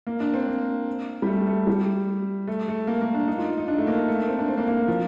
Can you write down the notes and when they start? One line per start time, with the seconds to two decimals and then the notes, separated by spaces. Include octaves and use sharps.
0.07 A#3
0.20 D4
0.34 C4
0.48 A#3
1.22 G3
1.27 A3
1.47 A3
1.67 G3
2.48 A3
2.68 A3
2.87 A#3
3.01 A#3
3.14 D4
3.28 D#4
3.38 F4
3.58 D#4
3.68 D4
3.78 A3
3.87 A#3
4.08 A3
4.17 A#3
4.27 C4
4.38 D4
4.48 C4
4.58 A#3
4.68 A#3
4.88 F3